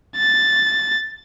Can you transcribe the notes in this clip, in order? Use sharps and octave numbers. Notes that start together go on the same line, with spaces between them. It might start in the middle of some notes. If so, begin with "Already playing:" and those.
A6